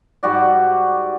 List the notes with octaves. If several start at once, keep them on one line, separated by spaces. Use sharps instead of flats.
G#2 G3 F#4 D5